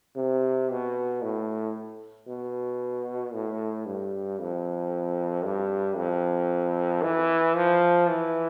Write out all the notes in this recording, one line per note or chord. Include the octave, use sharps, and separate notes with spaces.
C3
B2
A2
B2
A2
G2
F2
G2
F2
E3
F3
E3